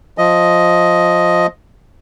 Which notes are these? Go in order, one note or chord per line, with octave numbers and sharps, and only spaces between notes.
F3 D#5